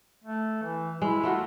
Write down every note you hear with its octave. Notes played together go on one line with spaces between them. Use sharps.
A3
E3
G#3 E4
A3 F4 F#4